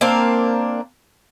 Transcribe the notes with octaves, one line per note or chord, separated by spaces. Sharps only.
A#3 C4 D4 F5